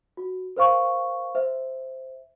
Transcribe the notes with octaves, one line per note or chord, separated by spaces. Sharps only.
F#4
A#4 C5 F5 C#6
C5 E5